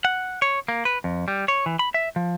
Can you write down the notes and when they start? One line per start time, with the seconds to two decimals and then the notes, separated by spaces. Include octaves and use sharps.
0.05 F#5
0.42 C#5
0.68 A#3
0.85 B4
1.04 F2
1.28 G3
1.48 C#5
1.66 E3
1.79 B5
1.94 E5
2.16 F3